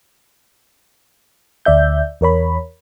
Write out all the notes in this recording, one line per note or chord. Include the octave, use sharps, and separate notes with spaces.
D2 D5 E5 G6
E2 A#4 C#5 B5